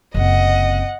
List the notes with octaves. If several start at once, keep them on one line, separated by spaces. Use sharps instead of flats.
F#1 C3 D#5 F#5